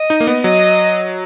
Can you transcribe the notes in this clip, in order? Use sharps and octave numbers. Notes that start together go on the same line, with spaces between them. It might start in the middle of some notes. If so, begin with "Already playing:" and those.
Already playing: D#5
D#4
A#3
B3
F#3 D#5